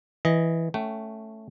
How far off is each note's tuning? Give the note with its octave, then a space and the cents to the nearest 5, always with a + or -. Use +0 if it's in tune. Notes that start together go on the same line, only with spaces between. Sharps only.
E3 +0 D#5 +5
A3 +0 C#4 +5 G5 -35